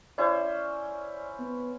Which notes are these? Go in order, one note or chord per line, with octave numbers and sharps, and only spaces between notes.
C#4 E4 C5 D5
B3